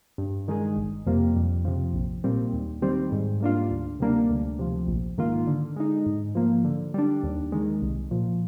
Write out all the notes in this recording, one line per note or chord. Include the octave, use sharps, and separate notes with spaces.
G2
D#3 G#3 D#4 G#4
G1
F2 C3 G3 A#3
F2
C3 F3
A#1
A#2 G3 C4
D#2
D#3 G3 C4
G#2
G3 A#3 D4 F4
D2
C3 G3 A#3 D4
D2
C3 F3
A#1
G#2 D#3 A#3 F4
D3
G#3 D#4
G#2
F3 A#3
D3
G3 D4
D#2
D#3 G#3
C2
A#2 F3